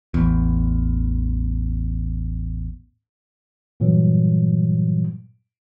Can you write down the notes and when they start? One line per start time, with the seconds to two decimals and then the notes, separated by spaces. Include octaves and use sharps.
0.14 A1 E2
3.80 G2 A#2 E3 F#3 G3